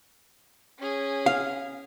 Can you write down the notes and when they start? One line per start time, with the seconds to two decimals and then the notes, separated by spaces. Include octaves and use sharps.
0.79 C#4 G#4
1.26 F5